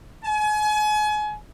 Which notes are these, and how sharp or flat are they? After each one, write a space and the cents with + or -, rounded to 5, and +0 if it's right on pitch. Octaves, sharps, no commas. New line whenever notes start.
G#5 +35